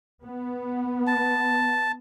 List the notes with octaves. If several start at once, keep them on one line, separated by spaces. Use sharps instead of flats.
B3
A5